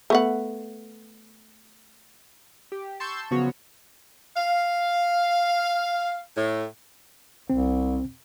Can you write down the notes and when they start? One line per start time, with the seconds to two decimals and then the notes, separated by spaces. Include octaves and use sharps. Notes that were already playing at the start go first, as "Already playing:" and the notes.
0.10 A3 B3 F#5
2.72 G4
3.00 A5 C6 C#6 E6 G6
3.31 C#3 F3 F#3 B3 F#4 C#5
4.35 F5
6.36 A2
7.50 C2 C4